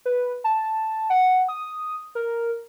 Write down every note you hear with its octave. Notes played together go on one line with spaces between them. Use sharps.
B4
A5
F#5
D#6
A#4